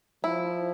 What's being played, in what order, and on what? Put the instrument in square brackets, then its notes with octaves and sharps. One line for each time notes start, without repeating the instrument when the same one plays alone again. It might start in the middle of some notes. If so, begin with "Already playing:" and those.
[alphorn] F3 [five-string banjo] E4